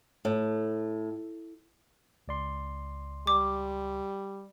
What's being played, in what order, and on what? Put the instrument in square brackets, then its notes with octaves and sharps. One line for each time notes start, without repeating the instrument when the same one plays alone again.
[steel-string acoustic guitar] A2
[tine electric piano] C#2 D5 C6
[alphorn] G3 [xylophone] D6